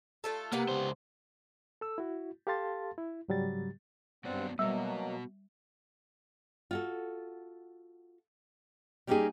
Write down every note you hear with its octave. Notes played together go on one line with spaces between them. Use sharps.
A3 F4 A4
C3 A#3 B3 F#5
C#2 C5
A4 E6
E4 F#4
G4 A4 F5 A5 C6 A6
E4
G#2 C#3 F#3 G3 G4 A6
G2 F#3 B3 C4 D5 F#5
B2 F#3 G3 A#3 B3 F#4
F4 F#4 A4
G3 A#3 C#4 D#4 G4 G#4